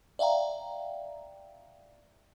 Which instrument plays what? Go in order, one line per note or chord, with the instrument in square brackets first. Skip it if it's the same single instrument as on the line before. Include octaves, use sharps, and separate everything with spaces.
[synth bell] D5 E5 F5 G5 A#5